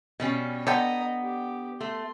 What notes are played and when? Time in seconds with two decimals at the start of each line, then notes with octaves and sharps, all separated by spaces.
0.20 B2 G3 C#4
0.67 D3 B3 D#5 G5 A#5
1.22 G4
1.81 A3 C6